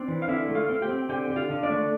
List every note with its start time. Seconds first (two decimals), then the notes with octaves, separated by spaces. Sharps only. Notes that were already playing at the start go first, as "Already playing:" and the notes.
Already playing: C4 D4 D5
0.08 E3
0.22 F5
0.28 D3 E4 E5
0.48 A3
0.55 F4 F5
0.69 C4
0.82 G4 G5
0.89 C4
1.09 D3 G4 G5
1.30 D3
1.36 F4 F5
1.50 D3
1.63 D4 D5
1.70 A3